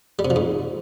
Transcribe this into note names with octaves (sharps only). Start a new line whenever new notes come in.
G3
C3
F3
G#2